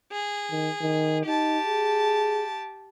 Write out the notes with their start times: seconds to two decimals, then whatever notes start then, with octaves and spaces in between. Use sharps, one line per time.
0.12 G#4
0.51 D#3
0.81 D#3
1.26 D#4 G4 A5
1.66 G#4